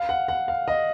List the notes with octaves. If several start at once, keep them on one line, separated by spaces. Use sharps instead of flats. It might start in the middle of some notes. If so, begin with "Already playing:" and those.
Already playing: F5
F#5
F#5
F5
D#5